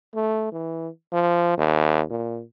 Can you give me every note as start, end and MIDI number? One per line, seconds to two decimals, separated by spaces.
0.14 0.50 57
0.52 0.89 52
1.12 1.57 53
1.58 2.03 39
2.10 2.42 46